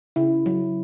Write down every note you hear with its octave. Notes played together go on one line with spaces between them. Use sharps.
C#3 E4
F#3